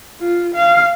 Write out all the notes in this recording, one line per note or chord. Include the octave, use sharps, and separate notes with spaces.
F4
F5